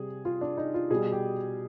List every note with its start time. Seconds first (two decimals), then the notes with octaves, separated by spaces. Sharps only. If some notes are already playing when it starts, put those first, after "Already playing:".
Already playing: C3 G3 G#4
0.25 F4
0.41 D4
0.57 D#4
0.74 F4
0.90 B2 G3 G#4
1.12 G4